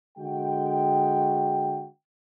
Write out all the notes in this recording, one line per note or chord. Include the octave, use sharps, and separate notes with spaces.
D3 G#3 F#4 G5